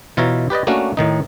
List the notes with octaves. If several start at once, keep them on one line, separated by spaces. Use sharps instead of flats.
B2 E3 F4 C#5 E5 A#5
G4 B4 D5 D#5
A3 A#3 C#4 D4 F#4
A2 D#3 D#4